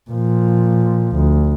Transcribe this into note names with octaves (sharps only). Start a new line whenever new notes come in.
A#2 F3
D2